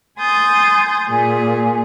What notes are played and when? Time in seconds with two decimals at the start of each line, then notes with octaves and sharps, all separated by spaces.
0.19 G#5 C6 D#6 G6 A6
1.07 A#2 G#4